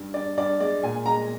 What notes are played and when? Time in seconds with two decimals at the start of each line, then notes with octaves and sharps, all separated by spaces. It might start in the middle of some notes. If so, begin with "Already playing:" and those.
Already playing: G2
0.14 G2 D5
0.37 G2 D5
0.60 G#3 D5
0.83 A#2 G#5
1.06 G#3 A#5